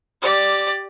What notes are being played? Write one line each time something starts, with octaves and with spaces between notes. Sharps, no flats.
G4 D5